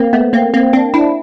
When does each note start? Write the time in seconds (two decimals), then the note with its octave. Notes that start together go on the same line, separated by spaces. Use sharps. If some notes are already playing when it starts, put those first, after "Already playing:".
Already playing: A#3 C4
0.13 A3 B3
0.33 A#3 C4
0.54 A#3 C4
0.73 C4 D4
0.94 D4 E4